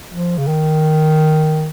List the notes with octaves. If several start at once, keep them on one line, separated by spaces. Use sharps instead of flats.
F3
C#3
D#3